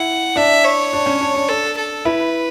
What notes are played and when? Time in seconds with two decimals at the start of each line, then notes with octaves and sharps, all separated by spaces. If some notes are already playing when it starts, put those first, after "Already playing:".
Already playing: E4 F#5
0.36 D4 E5
0.64 C#5
0.93 D4
1.06 C#4
1.21 D4
1.35 D4
1.49 A4
1.77 A4
2.05 E4 B4